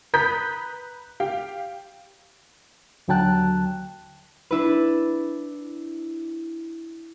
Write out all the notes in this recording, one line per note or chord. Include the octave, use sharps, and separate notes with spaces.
B4 A#5 B5 D#6 G6 B6
G4 F5 G5
D#2 D3 F#3 G5 A5 F#6
D4 E4 B4